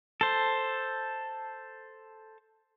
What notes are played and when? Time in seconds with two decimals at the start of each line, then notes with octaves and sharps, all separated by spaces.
0.21 A4 C5